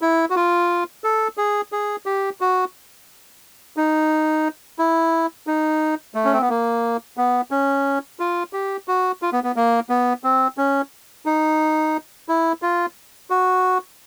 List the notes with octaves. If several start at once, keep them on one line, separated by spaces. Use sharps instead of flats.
E4
F#4
F4
A4
G#4
G#4
G4
F#4
D#4
E4
D#4
A3
C#4
C4
B3
A#3
B3
C#4
F4
G4
F#4
F4
B3
B3
A#3
B3
C4
C#4
D#4
E4
F4
F#4